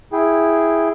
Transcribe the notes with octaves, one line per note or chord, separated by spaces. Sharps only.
E4 G#4 G5